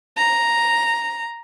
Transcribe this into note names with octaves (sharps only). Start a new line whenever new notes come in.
A#5